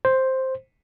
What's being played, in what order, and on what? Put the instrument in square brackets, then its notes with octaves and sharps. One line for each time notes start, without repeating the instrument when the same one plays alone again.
[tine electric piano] C5